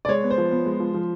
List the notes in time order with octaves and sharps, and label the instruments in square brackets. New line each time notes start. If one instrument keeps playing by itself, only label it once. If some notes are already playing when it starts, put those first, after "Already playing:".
[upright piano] D5
G#3 C#5
B3
C5
F3
B3
G#3
F3
F3